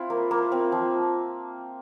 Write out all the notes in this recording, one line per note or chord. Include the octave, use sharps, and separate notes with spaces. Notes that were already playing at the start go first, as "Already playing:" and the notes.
Already playing: C4 E4 F4
A#3
A#3
C4
F3